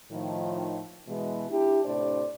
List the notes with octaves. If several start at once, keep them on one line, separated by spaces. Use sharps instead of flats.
A2 D#3 F3
B2 E3 G#3
D4 E4 G4
A2 C3 D4 C5 D5